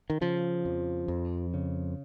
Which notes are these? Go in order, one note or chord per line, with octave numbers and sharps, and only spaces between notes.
D#3
C#3 F3
F2
F2
C#3